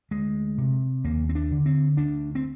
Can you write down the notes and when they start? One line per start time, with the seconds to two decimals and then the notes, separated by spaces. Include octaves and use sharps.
0.11 D2 G#3
0.58 C3
1.04 D#2 A#3
1.29 C4
1.35 D4
1.51 D3
1.66 C4
1.97 D2 D4
2.35 C4